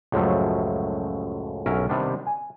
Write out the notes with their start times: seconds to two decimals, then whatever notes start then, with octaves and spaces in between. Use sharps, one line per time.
0.12 C#2 F#2 A2 F3 F#3 A3
1.66 B1 G2 C#4 A#4 E5
1.89 C3 D#3 G3 B3 D4
2.27 G#5